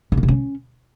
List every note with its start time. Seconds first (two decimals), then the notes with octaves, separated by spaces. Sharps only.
0.12 C#3
0.17 A#3
0.23 C3
0.28 C#4